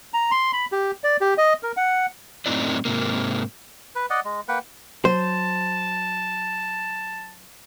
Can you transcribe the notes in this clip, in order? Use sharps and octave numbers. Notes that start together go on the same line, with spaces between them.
A#5
C6
B5
G4
D5
G4
D#5
A#4
F#5
F#2 A2 C4 D#4 E4 D5
G#2 C3 A#3
B4
D5 D#5 F#5
G#3
A#3 B4 F#5 G5
F#3 C5 A5